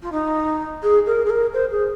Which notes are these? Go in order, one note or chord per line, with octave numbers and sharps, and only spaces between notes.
F4
D#4
G#4
A#4
G#4
A#4
C5
G#4